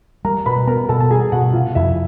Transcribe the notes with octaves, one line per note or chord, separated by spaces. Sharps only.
G3 A#4 A#5
B2 B4 B5
B3 A#4 A#5
B2 A4 A5
A5
G3 G#4 G#5
B2 F#4 F#5
C3 F4 F5
F2 E4 E5